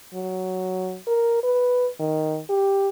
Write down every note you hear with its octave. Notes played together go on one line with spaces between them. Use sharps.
F#3
A#4
B4
D#3
G4